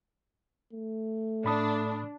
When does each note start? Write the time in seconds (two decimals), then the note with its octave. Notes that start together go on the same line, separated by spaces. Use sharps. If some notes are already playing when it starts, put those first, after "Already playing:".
0.73 A3
1.44 A2 D4 B5 D#6